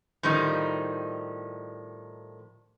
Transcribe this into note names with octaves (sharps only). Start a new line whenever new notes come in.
A2 D#3 F3 G3 D#4